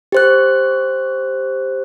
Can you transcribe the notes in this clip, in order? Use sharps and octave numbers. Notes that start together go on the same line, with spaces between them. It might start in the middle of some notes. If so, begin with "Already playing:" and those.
G4 C5 F#6